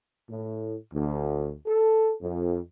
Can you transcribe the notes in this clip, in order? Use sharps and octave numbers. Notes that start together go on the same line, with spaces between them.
A2
D2
A4
F2